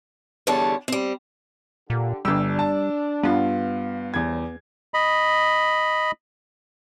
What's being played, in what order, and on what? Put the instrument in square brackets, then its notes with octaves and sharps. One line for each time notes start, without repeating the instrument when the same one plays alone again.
[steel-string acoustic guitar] E2 D3 G3 D4 C#5 A5
G3 C4
[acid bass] A#2 [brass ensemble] D3 G4
[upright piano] G1 E6 [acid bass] G3 [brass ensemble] D4
[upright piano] A5
[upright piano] G2 F4 [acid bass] B3
[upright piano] E2 G#6 [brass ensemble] A2 F3 G3
[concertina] D#5 B5